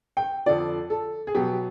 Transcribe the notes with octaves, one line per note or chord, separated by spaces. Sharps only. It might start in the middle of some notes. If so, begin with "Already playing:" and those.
G5
F2 D3 F3 D5
A4
G#4
B2 F#3 B3 G4